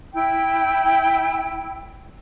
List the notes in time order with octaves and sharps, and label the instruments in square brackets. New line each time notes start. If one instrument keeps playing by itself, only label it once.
[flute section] E4 G5